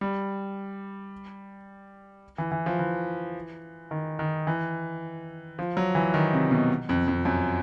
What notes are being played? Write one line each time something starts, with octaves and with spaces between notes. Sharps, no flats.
G3
E3
E3
F3
E3
D#3
D#3
E3
F3
F#3
E3
D#3
C3
B2
F2
F2
F#2